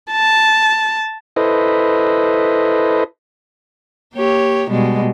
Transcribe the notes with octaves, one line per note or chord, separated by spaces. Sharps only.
A5
E4 A4 B4 C5 D#5
A#3 G4 C#5
B2 G3 G#3